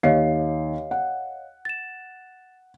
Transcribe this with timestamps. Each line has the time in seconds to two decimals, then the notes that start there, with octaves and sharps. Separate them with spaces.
0.03 D#2 C#5 D#5 F5 C7
0.91 F#5
1.65 A6 E7